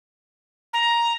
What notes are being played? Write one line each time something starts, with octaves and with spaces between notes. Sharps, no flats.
A#5